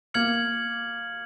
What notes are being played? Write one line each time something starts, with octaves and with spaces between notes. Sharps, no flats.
A#3 F6 G#6 C#7 F#7